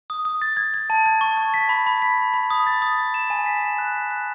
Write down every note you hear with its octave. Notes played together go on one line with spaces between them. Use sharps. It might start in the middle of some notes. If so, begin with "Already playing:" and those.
D#6
D#6
A6
G#6
G#6
A5
G#6
C#6
G#6
B6
B5
B5
B6
B6
B5
D#6
A6
D#6
A6
E7
G#5
B6
E7
F#6
B6
F#6